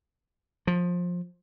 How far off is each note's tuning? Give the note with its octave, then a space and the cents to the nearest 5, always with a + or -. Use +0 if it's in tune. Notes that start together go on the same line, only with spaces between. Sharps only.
F3 +20